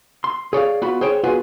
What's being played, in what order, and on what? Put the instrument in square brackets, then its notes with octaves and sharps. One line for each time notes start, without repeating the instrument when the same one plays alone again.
[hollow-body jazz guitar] C6
G#4 C#5 D5 F5
B3 F4 F#4 B5
G#4 C5 C#5 G5
B3 F4 F#4 G#4 B4 F#5